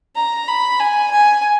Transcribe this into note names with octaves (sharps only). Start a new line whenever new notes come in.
A#5
B5
G#5
G#5